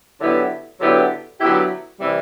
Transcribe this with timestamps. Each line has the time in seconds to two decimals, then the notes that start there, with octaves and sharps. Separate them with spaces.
0.20 D3 F#3 B3 E4 G4
0.80 D3 F#3 B3 E4 G4
1.39 D3 F#3 B3 E4 G4
2.00 C3 E3 G3